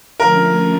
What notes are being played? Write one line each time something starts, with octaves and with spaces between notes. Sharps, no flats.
D3 F3 A3 C#4 F4 A#4